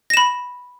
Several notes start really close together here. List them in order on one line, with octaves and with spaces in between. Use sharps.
A#6 E7 B5